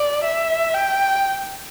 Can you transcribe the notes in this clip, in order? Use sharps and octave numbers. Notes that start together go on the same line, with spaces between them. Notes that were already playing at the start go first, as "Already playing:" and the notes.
Already playing: D5
E5
G5